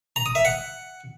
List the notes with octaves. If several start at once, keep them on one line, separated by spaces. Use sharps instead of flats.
A#5
D#6
E5
F#5